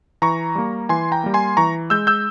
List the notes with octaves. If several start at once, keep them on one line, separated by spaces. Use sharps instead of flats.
E3 A#5 C#6
G3 A#3
E3 G#5 C6
G5 A#5
G3 A#3
G#5 C6
E3 A#5 C#6
G#3 E6 G6
E6 G6